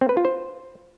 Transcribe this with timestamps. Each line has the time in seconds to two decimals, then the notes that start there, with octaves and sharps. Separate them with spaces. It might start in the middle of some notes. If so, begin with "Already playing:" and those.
0.01 C4
0.09 B4
0.17 F4
0.25 C5